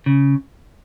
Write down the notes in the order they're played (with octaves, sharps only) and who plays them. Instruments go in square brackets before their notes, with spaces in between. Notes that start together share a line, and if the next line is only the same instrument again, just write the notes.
[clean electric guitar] C#3